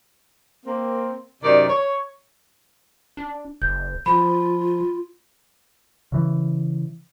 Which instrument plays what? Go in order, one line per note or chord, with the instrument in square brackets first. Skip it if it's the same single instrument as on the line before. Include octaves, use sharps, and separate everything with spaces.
[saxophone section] A#3 C4
F#2 C3 D#3 D5
C#5
[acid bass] D4
[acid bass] F#1 [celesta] G6
[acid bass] F3 [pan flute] F4 [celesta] B5
[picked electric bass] C#3 E3